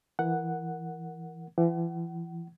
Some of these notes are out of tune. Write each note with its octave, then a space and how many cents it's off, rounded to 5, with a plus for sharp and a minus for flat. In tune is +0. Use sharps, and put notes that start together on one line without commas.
E3 +10 A#4 +0 F#5 +0
E3 +35 F#5 +35